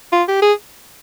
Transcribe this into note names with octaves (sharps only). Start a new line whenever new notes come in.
F4
G4
G#4